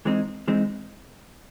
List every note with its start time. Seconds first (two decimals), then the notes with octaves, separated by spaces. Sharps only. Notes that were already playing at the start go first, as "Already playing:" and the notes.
0.05 E3 G#3 C4 D#4
0.48 E3 G#3 C4 D#4